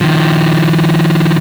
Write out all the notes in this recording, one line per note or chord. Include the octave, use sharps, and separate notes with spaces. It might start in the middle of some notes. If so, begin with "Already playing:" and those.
D#3 F3